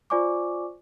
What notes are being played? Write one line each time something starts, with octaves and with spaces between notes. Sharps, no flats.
F4 C5 D5 G#5 C#6 D6